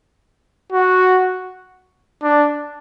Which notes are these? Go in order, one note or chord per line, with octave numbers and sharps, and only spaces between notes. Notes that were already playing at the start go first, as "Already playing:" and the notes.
F#4
D4